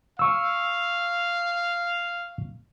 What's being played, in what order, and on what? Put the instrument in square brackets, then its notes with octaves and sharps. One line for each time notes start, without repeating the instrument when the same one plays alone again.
[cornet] F5 [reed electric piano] C#6 E6